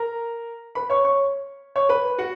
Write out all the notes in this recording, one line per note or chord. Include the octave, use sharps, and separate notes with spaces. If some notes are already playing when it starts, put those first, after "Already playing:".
Already playing: A#4 A#5
B4 B5
C#5 C#6
C#5 C#6
C#5 C#6
B4 B5
F#4 F#5